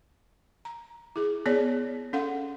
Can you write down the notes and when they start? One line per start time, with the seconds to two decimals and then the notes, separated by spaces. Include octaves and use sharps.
0.65 A#5
1.16 E4 G#4
1.46 B3 G#4 C#5 D5
2.13 C#4 A4 F5 F#5